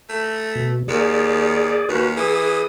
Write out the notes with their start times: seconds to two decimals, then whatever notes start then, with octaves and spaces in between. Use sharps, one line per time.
0.09 A3
0.55 B2
0.88 D#2 G#4 D5
1.89 D#2 F#4 B4
2.17 E3 G#4 D#6